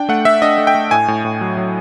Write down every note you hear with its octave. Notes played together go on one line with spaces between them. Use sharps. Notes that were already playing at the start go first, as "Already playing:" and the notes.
Already playing: D4 G5
A3 F#5
A3 E5
D4 D#5
A3
G5
A3
A2 G#5
A2
A2
F#3
F#3